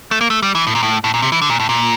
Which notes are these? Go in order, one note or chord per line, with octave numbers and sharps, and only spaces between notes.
A3
A#3
A3
G3
E3
A2
A#2
A2
A2
A#2
C3
E3
D3
A#2
A2
A#2